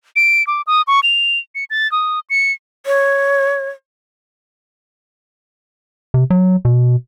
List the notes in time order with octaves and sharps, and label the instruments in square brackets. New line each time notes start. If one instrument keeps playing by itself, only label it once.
[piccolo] D7
D6
D#6
C#6
F7
C#7
A6
D#6
C#7
[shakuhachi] C#5
[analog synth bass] C3
F#3
B2